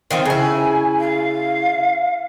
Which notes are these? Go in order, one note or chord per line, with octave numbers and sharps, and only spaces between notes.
D#3 F3 C4
C#3 E4 G#5
F5